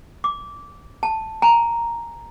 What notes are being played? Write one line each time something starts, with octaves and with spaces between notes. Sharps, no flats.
D6
A5
G#5 A#5